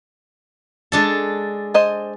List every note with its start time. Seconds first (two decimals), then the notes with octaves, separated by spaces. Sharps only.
0.92 G#3 D4 A4
1.74 C5 D#5 G#5